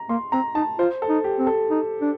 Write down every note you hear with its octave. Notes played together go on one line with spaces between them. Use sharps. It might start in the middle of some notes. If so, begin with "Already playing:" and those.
Already playing: A#5
A#3 C6
C4 A#5
D#4 A5
F4 C5
A4
D#4
G4
C4
A4
D#4
D4